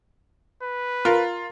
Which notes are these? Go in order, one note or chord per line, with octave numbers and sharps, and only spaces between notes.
B4
F4 A#4